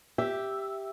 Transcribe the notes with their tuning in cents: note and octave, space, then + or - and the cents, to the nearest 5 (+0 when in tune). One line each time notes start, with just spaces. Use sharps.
G4 +0 E5 +0